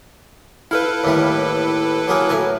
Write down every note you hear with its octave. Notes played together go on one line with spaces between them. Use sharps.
E4 A4 B4 F5
D#2 A2 G3
F#3 A#3 G#4
A2 G#5 A#5